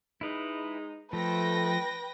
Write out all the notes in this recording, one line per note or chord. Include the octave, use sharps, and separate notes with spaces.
G#3 D#4 E4 B4
F3 A3 B4 G5 A#6